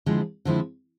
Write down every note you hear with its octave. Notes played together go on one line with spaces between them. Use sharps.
D3 F3 G#3 C4 E4
D3 F3 G#3 C4 E4